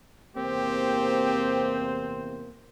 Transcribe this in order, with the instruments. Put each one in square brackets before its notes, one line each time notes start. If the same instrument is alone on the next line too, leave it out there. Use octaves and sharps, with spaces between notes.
[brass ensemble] E2 C3 C5 [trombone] A#3 [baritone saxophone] C4 [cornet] G4